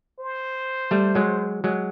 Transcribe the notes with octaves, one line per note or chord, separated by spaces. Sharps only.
C5
G3 A3
F#3 G#3
F#3 G#3